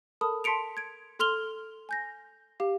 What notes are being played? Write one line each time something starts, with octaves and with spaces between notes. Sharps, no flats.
A4 A#4 A5 B5 D#6
A5 C6 B6 C#7 D7 F7
G#6 D7
A4 C6 F6 F7 G7
G#5 G6 A#6
G4 F5